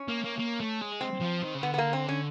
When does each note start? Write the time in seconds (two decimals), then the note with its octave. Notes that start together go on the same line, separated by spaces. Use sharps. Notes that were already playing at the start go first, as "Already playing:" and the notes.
Already playing: C#4
0.08 A#3
0.24 A#3
0.39 A#3
0.60 A3
0.81 G#3
1.01 C4
1.21 F3
1.43 D#3
1.55 C#3
1.62 D3 B3
1.74 B3
1.78 A#3
1.93 C4
2.09 C#4